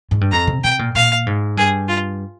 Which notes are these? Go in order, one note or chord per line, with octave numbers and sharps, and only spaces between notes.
G#2
G2
F2 A#5
C3
C3 G5
A#2
A#2 F5
G#2
G2 G#4
F4